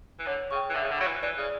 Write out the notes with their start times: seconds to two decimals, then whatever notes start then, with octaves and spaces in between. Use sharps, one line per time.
0.19 E3
0.26 D3 C#5
0.51 C#3 C#6
0.55 G5
0.70 E3
0.75 D3 E5
0.83 C#3
0.91 D3
0.98 F#3 B5
1.03 E3 F#6
1.23 E3 D5
1.37 C#3